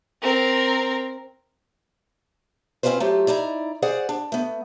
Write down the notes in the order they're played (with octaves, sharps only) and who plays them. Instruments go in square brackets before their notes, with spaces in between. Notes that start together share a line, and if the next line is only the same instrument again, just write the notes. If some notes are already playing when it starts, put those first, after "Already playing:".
[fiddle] C4 A#4
[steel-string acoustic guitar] C4 C#4 D#4 F4 B4 C5
F#3 A3 F4 G4
D#4 E4 D5 A#5
G#4 C5 D5 F#5
D4
A3 B3